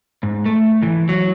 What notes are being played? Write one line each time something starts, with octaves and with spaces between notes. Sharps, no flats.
G#2
A3
E3
F#3